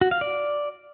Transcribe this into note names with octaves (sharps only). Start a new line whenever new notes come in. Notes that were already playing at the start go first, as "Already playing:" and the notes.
F#4
F5
D5